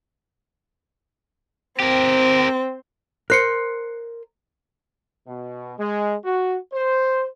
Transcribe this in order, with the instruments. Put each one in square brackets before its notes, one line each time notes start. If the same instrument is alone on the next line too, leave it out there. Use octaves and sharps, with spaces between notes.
[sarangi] C4 [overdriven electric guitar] G4 A#4
[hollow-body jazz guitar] A#4 C5 [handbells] F#6 C7 C#7
[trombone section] B2
G#3
F#4
C5